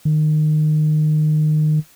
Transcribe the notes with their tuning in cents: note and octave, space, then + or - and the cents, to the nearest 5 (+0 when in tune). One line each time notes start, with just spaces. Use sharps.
D#3 -25